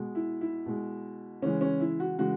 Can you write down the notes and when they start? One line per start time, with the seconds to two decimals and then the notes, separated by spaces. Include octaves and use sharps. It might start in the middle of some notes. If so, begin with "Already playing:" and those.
Already playing: B2 G#3
0.15 E4
0.41 E4
0.66 B2 G#3
1.42 C#3 E3 G#3 C#4
1.61 C#4
1.80 E4
2.00 F#4
2.19 C#3 E3 G#3 F#4